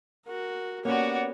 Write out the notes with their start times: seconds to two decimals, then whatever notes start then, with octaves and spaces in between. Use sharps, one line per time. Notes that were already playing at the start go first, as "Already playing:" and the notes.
0.26 F#4 A#4
0.85 A#3 B3 C#4 F#4 G4 C#5 D5 F#5